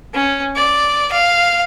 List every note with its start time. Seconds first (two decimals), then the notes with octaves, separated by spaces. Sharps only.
0.14 C#4
0.56 D5
1.12 F5